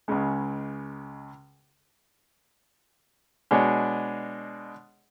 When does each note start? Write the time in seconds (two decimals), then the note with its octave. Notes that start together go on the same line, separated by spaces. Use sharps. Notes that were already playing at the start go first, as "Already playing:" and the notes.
0.08 C#2 C#3 G#3
3.51 B2 G#3 D4 G#4 C#5